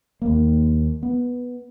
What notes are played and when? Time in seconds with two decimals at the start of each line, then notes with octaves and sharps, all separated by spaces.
0.22 D#2 A#3
1.03 B3